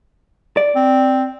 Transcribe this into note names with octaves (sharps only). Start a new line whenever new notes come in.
D5
C4